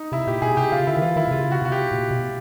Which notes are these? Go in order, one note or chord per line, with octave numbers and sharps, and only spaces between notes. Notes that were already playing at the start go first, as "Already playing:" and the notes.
Already playing: D#4
C3 E4
A#2 G4
B2 G#4
C3 G4
C#3 F4
D3 E4
D#3
E3 F4
D#3 E4
C3
C#3 F4
F#4
C3 F#4
G4
A#2
B2